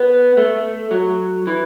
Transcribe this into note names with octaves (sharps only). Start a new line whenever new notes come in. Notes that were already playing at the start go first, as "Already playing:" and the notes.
Already playing: B3
A3
F#3
E3